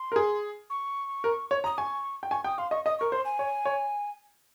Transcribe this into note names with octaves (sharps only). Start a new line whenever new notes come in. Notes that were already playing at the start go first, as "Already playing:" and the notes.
Already playing: C6
A#4
G#4
C#6
A#4
C#5
A#5 D#6
G#5 C#6
G5
G#5 C#6
G5 D#6
F5 C6
D#5 C#6
D#5 D#6
A#4 C#6
C5 C6
G#5
C#5
C#5